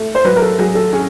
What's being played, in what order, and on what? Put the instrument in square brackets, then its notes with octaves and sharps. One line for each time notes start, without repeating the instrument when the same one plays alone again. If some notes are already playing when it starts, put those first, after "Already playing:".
Already playing: [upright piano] A3
[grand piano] C5
[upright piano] F#3 [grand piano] B4
[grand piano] A#4
A4
[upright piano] F#3 [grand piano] G#4
[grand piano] A4
[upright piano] C#4 [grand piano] G#4